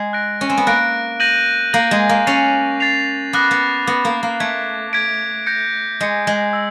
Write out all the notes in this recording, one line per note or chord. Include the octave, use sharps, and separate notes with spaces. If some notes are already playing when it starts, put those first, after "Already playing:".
Already playing: G#3
F#6 A#6 D7
C#4
C4
B3
A#3 F#6 A#6 D7
G6 A#6 D#7 F#7
A#3 G6 A#6 D#7 F#7
G#3
A#3
C#4 A6 C7 F7
A6 C7 F7
B3 D6 F#6 A#6
B3
B3 D6 F#6 A#6
A#3
A#3
A3 G#6 B6 D7
G#6 B6 D7
G6 A#6 C#7
G#3 G6 A#6 C#7
G#3
E6